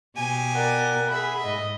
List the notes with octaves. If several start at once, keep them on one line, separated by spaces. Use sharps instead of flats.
B2 G4 G#5
A#4 D5 F#5
G#4 E5 B5
G#2 D#5